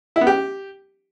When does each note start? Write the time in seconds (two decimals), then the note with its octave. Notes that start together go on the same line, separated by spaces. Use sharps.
0.16 E4
0.21 B3
0.27 G4